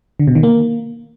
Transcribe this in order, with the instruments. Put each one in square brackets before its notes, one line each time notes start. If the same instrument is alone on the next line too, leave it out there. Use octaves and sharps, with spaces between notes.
[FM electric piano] D3
B2
D#3
A#3